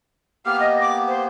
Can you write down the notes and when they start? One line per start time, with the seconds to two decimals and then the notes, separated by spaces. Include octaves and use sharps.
0.46 A#3 B3 G4 F6
0.60 D#5
0.81 D6
1.08 C5